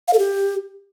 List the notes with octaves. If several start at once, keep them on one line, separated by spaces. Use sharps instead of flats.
F5
A4
G4